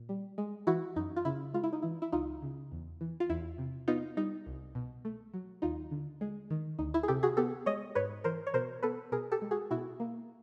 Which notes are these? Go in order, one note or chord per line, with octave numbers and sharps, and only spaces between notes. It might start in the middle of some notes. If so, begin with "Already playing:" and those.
Already playing: A#2
G3
G#3
E3 E4 F#4
F#2 D#4
F4
C#3 E4
G#3 F4
E4
D#4
E3 E4
E4
C#2 D#4 F4
C#3
E2
E3
F4
E2 E4
C3
B3 D#4 F4
G3 D#4
C2
B2
A3
F#3
D#2 D#4 F4
D3
G#3
D#3
D2 D#4
E4
G#4
C3 G4 A4
F#4 G#4
B3 G4 A4
G#3 C#5 D#5
G#2 B4 C#5
E3 A#4 C5
C#5
B2 A#4 C5
B3 A4 B4
B2 G#4 A#4
G4 A4
G#3
F#4 G#4
B2 E4 F#4
A#3